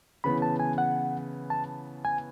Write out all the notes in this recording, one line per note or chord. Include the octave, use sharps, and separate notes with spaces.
C#3 E3 B3 B5
A5
G#5
F#5
A5
G#5